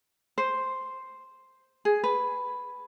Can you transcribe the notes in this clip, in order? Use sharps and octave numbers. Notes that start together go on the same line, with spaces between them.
C5
G#4
B4